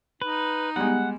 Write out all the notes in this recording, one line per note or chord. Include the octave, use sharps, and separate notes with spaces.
D#4 B4
G3 G#3 B3 F#5